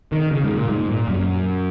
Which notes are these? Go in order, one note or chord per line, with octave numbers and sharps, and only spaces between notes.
D#3
C#3
G#2
A#2
G#2
A#2
F#2